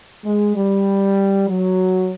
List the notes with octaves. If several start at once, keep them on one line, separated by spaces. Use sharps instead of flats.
G#3
G3
F#3